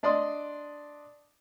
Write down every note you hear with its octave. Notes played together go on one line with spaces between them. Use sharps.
D4 D5 D#5 C6 D#6